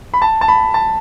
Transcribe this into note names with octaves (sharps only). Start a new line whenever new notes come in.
B5
A5
A5
B5
A5